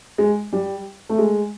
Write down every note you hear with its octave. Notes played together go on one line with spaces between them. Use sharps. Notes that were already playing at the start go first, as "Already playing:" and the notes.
G#3
G3
A3
G#3